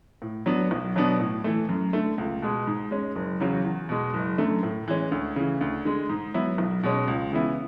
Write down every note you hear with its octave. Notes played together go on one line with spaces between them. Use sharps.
A2
F#3 B3 D4
B1
B2 F#3 B3 D4
A2
E3 A3
F#2
D3 A3
C#2
B2 G#3
G#2
G#3 C#4
F#1
E2 C#3 F#3
E2
B2 G#3
F#1
F#2 D3 A3
A2
E3 G#3 C#4
D2
C#3 E3
D2
D3 G#3
G#2
F#3 B3 E4
B1
B2 G#3 C#4
C#2
C#3 E3 B3 E4